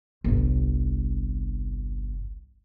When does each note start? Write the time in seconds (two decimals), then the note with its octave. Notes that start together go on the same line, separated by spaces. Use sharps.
0.24 G1 C2